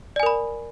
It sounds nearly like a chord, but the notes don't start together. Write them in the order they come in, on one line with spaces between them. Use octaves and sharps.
D5 G#5 A#4 B5